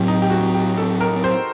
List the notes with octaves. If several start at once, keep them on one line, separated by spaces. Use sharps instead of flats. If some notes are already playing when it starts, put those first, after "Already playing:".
Already playing: A2 F#3 C4 G4
D#4
G4
F#4
G4
A4
A#4
C5